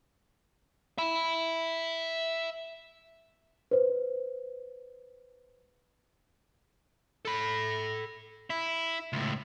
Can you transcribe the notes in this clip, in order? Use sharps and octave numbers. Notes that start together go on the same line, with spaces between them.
E5 B5
B4 C5
A4 B5
E4
C#2 A2